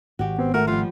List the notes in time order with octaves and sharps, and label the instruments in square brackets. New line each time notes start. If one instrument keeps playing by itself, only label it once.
[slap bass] G#1 [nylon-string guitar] F#4 G4
[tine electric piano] B3 [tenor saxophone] C4
[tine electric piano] A3 F#5 [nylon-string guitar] F#4 [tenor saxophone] A#4
[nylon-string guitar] F3 G3 [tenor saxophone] F4